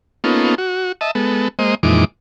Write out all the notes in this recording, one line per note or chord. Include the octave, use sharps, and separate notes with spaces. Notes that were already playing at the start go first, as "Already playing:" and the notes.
A#3 B3 C#4 D#4 F4 A4
F#4
D#5 E5 A5
G#3 B3 A4
G#3 A#3 C5 D#5
F2 A#2 E3 G#3 D#4 D6